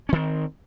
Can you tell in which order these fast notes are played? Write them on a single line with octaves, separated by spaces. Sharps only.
C#4 D#3 C4